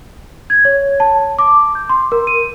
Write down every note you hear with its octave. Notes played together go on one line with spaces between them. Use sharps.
G#6
C#5
A5
D6
G6
C6
A#4
D#7